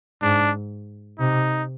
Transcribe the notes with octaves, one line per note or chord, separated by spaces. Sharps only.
G#2 D4
C3 D#4